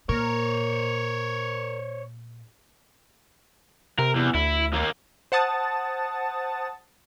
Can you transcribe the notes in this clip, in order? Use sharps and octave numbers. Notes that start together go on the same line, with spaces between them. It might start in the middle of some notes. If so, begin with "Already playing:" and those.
A#2 A#4 C5 C#5
C3 A#4
E2
D2 E4
D#2 A#3
C5 F#5 A5 D#6 A6